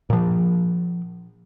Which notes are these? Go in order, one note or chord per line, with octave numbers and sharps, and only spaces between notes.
A#2 F3